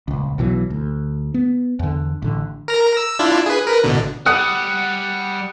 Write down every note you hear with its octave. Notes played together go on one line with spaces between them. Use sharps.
D#1 C#2
B1 B2 E3 F#3
D2
B3
E2 D3
A1 D3
A#4 A#5
E6
D4 E4 F4
G#4 B4
A#4 B4
A1 B2 D3
G3 F#5 D#6